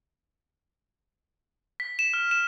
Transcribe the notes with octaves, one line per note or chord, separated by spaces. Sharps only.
B6
E7
F6
E7